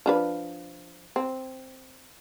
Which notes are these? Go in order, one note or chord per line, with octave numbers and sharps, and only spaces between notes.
F3 D4 B4
C4